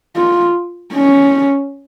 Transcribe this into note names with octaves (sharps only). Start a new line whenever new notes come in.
F4
C#4